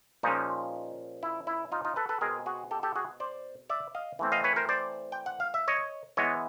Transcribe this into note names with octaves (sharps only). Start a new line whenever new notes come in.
A#2 F3 G#3 C#4 D#4
E4
E4
D#4 F4
D#4 F4
A4 B4
A4 B4
B2 G#3 C4 G#4 A#4
F#4 G#4
G4 A4
G4 A4
F#4 G#4
C5 D5
D5 E5
D#5 F5
E3 A3 C4
D#5 F5
B4 C#5
A#4 C5
C5 D5
G5
F#5
F5
E5
C#5 D#5
E3 G#3 B3 C#5 D#5